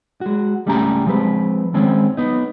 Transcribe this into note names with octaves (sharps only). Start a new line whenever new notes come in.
G#3 F#4
C#2 G3 A3 C#4 G4 A#5
F3 G#3 C4 B4
D#3 G#3 C4 C#4
B3 D#4